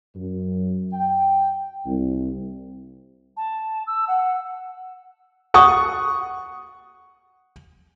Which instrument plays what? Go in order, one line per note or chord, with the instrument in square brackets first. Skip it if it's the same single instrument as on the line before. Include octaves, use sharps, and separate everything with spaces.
[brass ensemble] F#2
G5
C2
[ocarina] A5
E6
F#5
[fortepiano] F#5 C#6 D#6